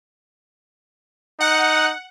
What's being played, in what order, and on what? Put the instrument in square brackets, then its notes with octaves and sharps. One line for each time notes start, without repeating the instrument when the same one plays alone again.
[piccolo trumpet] D#4 [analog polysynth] F#5